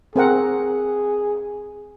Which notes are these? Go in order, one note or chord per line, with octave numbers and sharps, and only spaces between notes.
C4 G#4 A#4 F#5